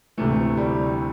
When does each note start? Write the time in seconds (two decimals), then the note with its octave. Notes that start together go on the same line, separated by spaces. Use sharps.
0.17 D2 C3 E3 A3
0.57 G3